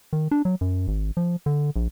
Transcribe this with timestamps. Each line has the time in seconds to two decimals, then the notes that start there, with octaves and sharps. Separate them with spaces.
0.13 D#3
0.31 D4
0.45 F#3
0.61 F#2
0.88 G#1
1.17 F3
1.46 D3
1.76 A#1